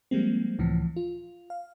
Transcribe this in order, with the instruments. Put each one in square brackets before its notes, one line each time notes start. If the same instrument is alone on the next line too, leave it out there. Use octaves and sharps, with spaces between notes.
[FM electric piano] F3 G3 G#3 A#3 C4
C#2 A2 E3 F3
F4
F5